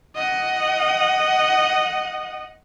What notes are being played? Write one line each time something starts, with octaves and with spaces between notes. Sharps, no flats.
D#5 F#5